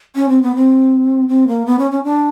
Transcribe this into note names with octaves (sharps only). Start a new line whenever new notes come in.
C#4
C4
B3
C4
C4
A#3
B3
C#4
C#4
D4